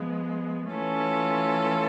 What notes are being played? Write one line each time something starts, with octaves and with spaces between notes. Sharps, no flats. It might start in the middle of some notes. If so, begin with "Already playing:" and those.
Already playing: F3 G#3 B3
E3 A3 C#4 F4 A4